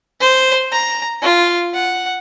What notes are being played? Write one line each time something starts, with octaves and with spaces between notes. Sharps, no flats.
C5
A#5
F4
F#5